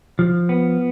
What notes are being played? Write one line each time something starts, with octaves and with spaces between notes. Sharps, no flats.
F3
B3